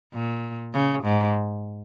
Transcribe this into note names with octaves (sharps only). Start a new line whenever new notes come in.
A#2
C#3
G#2